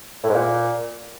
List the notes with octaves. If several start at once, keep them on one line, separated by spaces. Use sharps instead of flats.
A2
G#2
A#2